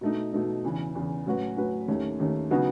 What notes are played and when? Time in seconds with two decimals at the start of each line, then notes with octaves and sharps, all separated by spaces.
0.01 B2 A3 D#4
0.33 B2 A3 D#4
0.64 E2 C#3 E3
0.95 E2 C#3 E3
1.26 A2 F#3 C#4 F#4 B4
1.57 A2 F#3 C#4 F#4 B4
1.88 D#2 D#3 A3 C#4
2.20 D#2 D#3 A3 C#4
2.51 C#3 F#3 B3 D#4 F#4